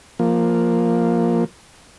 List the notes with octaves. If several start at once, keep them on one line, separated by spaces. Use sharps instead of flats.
F3 A#3